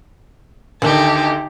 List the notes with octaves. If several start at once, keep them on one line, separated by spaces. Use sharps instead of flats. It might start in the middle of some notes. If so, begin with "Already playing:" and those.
D2 D3 D#3 D#4 G4 A5